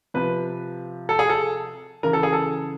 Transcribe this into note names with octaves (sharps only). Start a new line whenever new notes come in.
C3 F3 B4
A4
G#4
A4
C#3 E3 A#4
A4
G#4
A4